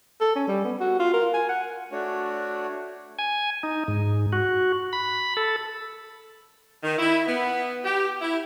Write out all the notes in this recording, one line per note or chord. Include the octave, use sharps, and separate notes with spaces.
A4
C#4
G3
B3
F#4
F4
A#4
G#5
F#5
A3 D4 F#4 C#5
G#5
D#4
G#2
F#4
B5
A4
D#3
E4
B3
G4
E4